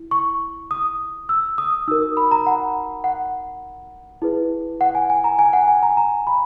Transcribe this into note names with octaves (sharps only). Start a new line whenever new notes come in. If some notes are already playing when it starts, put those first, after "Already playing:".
Already playing: E4
C#6
D#6
E6
D#6
D#4 F#4 A#4 E6
D#6
B5
A#5
F#5
F#5
E4 G#4 B4
F#5
G#5
G#5
A#5
G#5
F#5
G#5
A#5
A#5
B5